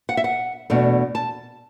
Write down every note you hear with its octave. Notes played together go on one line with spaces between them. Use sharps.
F#5
E5
F#5
E2 B2 A3 D4
A5